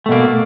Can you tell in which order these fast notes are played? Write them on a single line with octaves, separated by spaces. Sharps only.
A3 B2 A#3